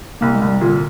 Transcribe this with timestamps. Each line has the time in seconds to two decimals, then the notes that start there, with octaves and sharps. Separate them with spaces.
0.21 C2 A#3
0.35 G#3
0.41 C2
0.48 G3
0.61 A#2 D3